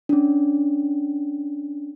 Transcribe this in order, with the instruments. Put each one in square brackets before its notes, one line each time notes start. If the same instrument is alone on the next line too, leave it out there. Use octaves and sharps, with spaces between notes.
[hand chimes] C#4 D4